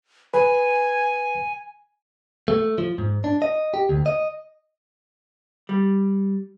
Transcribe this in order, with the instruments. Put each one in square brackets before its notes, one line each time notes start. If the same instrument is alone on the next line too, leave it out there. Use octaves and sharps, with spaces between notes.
[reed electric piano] B4 [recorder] G#5
[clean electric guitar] A3
F3
G#2
D4
D#5
G4
D2
D#5
[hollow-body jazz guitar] G3